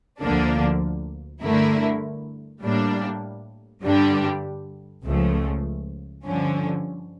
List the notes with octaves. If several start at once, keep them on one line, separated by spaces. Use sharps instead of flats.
D2 D3 F3 A#3 D4
G2 D3 A3 E4 A#4
A2 G3 A#3 D4
G2 D3 G3 D4 G4
C#2 C#3 F3 A3
G2 D3 F3 C#4